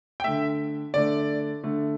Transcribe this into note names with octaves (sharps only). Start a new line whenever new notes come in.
G5
D3 A3 E5
D3 A3 D5
D3 A3